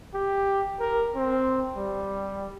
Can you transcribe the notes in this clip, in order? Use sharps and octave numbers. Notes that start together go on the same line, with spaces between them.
G4
A#4
C4
G3